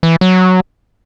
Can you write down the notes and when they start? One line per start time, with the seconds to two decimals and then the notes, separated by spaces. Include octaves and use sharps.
0.03 E3
0.21 F#3